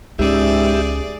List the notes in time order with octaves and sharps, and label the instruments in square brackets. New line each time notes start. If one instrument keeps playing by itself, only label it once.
[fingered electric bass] C#2 C4 C#4 [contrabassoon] G#2 [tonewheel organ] G4 E5 [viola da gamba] G#4 D5